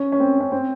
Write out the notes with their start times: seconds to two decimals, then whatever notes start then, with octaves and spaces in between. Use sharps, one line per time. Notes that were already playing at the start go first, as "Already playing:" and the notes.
Already playing: C#4
0.12 C#4
0.20 C4
0.41 C#4
0.52 C4